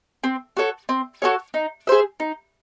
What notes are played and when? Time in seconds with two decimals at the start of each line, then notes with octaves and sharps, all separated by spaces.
0.24 C4
0.57 F#4 A4 C#5
0.89 C4
1.22 F#4 A4 C#5
1.54 D#4
1.87 G#4 C5 E5
2.20 D#4